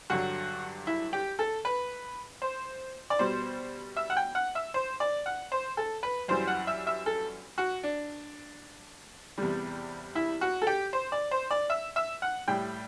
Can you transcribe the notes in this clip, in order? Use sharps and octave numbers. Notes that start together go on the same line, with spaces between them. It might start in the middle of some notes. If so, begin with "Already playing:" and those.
G2 D3 F#3 F#4
E4
G4
A4
B4
C5
D5
B2 G3 C5
E5
F#5
G5
F#5
E5
C5
D5
F#5
C5
A4
B4
F#2 E3 G3 C5
F#5
E5
E5
A4
F#4
D4
E2 C3 G3
E4
F#4
A4
G4
C5
D5
C5
D5
E5
E5
F#5
A2 G3 G5